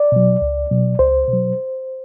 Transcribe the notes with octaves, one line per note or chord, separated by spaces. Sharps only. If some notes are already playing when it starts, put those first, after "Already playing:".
Already playing: D5
B2 F#3
C#2
B2 F#3
C#2 C5
B2 F#3